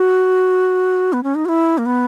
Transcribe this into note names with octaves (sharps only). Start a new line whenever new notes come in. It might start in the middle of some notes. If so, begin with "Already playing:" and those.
Already playing: F#4
B3
C#4
D#4
F#4
E4
A#3
B3